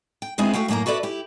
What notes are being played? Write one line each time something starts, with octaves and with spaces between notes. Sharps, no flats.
G5
D2 G#3 B3 C4 E4 G#4
A3 F#4 F5 G5
F#2 A2 A#3 F5 A#5
F#4 A4 B4 D5 E5
E4 G4